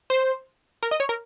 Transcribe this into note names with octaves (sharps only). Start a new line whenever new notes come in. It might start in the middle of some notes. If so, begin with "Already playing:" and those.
C5
A#4
D#5
C#5
A#4